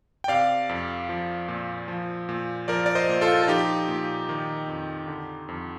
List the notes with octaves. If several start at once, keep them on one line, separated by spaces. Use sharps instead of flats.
G5
C3 D5 F5
F2
F3
A#2
F3
A#2
F3 A#4 D5
D5
C5 D#5
A#2
F4 A4
A4
F3 D#4 G4
A#2
D#3
F2
D3
F2